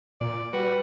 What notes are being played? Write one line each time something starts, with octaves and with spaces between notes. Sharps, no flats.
A#2 D5
G3 F#4 B4